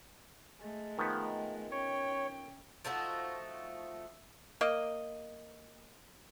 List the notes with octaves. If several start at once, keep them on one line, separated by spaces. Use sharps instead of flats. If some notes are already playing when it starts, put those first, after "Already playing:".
G#3 A3
D#3 F3 B3
C#4 C#5 G5
F3 A3 D#4 F#4
A#3 D#5